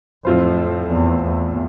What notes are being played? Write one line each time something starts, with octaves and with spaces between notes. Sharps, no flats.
F2 A2 F3 C4 F4 C5
E2
E2